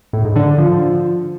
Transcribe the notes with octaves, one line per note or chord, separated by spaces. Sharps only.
A2
G#2
D3
D3
F3